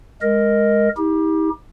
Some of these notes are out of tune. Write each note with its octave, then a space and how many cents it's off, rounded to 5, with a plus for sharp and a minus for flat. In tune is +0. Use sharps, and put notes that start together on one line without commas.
G#3 +0 A#4 +0 D#5 +0
D#4 +45 G4 +20